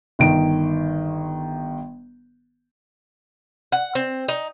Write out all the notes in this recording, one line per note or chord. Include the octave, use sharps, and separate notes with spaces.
G1 D#3 D7
F#5
C4
D#4